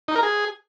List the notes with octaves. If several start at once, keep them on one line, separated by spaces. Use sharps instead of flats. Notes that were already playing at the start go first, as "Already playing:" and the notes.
D#4
A#4
G#4